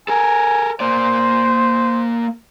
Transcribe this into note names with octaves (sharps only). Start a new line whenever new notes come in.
A4 A#4 G#5
A#3 C5 D5